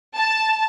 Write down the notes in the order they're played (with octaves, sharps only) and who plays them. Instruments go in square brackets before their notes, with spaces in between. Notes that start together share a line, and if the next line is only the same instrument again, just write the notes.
[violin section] A5